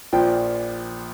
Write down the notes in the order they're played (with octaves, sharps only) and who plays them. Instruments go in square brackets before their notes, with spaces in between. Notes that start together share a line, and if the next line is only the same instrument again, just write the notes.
[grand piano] A#1 A#2 F3 G5